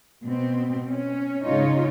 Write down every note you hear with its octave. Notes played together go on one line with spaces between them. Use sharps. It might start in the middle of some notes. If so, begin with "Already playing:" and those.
B2 C4
C#4
G#2 C#3 D#4 F4 C#5